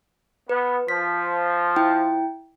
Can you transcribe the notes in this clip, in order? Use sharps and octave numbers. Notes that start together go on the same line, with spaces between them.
B3 B4
F3 B6
E4 G5